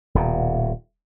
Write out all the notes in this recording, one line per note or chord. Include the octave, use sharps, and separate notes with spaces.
D#1 B2